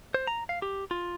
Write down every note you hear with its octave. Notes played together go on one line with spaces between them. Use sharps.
C5
A#5
F5
G4
F4